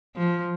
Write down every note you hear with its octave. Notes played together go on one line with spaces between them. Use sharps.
F3